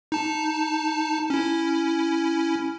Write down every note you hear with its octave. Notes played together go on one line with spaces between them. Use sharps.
D#4 A5
C#4 E4